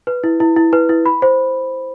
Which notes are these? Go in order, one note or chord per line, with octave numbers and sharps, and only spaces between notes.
B4
E4
E4
E4
B4
E4
B5
C5